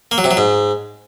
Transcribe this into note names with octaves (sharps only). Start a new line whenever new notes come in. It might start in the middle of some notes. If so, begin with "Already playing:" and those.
A#3
F#3
C3
F#3
G#2